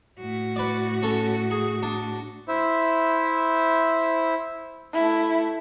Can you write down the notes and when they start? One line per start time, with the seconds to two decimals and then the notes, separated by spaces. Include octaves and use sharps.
0.20 A2 F#4
0.56 B4 D5
1.03 C#4 A4
1.51 G#4
1.83 D4
2.48 E4 C5 E5
4.94 A3 E4